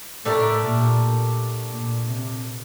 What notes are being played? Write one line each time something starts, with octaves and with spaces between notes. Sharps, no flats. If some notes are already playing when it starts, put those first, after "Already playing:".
A2 A3 D4 G4 A#4
A#2
A#2
C3